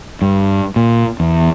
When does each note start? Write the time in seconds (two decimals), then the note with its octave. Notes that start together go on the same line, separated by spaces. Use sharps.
0.22 G2
0.76 A#2
1.20 E2